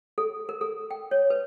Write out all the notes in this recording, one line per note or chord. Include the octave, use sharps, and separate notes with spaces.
A4
A#4
A4
G5
C#5
B4